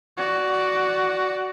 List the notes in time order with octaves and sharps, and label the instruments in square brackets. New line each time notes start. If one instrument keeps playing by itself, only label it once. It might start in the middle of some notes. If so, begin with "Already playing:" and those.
[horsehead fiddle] F#4 D5